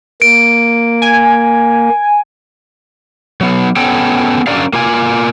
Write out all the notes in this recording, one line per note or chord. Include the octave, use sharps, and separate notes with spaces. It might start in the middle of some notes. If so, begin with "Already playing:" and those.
A#3 D7
G#5
F#3 B3
B3 C#4 A4 G5
F#3 C#4 D4 A#4 D5 F5
A#3 F4 G#5